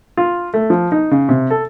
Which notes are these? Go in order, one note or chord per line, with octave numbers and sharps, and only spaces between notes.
F4
A3
F3
D#4
C#3
C3
A4